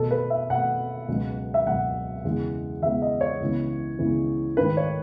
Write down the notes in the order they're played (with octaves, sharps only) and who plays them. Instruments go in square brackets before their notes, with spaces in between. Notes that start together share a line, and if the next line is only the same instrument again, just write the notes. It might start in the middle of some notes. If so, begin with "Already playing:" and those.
Already playing: [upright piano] B2 A3 A4
B4
E5
B2 A3 F#5
C#2 B2 F#3
E5
C#2 B2 F#3 F#5
E2 C#3 G#3 B3
E2 C#3 G#3 B3 E5
D#5
C#5
C#2 C#3 E3 B3
C#2 C#3 E3 B3
G#2 D#3 A3 B4
C#5